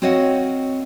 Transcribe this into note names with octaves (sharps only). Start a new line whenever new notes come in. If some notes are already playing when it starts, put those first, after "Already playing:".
C4 F#4 C#5 D#5 F5 F#5